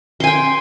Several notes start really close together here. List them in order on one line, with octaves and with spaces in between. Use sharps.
C6 G#5 G5